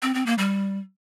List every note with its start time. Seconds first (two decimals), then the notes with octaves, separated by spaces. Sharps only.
0.02 C4
0.14 C4
0.26 A#3
0.38 G3